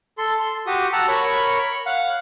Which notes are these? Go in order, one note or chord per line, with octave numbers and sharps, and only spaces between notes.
A4 C6
C6
F#4 G4 D#6
F#5 A5 A#5 E6
A#4 C#5 B5 C#6
F5 F#5